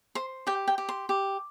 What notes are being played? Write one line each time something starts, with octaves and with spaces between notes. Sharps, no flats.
C5 C6
G4 G5
G5
G4
C6
G4